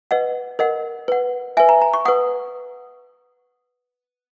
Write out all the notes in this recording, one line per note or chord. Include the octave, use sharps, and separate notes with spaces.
B4 D#5 F#5
A#4 D#5 F#5
B4 F#5
B4 E5 G#5
A#5
A#5
C#6
B4 F#5 D#6